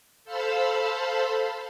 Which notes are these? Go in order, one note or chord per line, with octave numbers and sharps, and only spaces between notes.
A4 C5 F5 A5 B5 E6